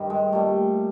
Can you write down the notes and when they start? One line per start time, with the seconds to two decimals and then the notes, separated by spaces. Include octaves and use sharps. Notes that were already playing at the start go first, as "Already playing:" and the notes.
Already playing: G2 D#3 G3
0.10 G#3
0.32 A#2 G3 A3